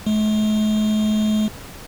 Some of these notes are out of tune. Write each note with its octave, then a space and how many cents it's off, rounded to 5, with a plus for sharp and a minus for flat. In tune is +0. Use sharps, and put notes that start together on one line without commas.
A3 -45